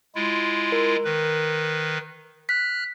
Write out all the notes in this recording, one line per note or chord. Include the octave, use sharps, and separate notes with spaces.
G#3 E4 F4
A#4
D#3 B4
F6 F#6 B6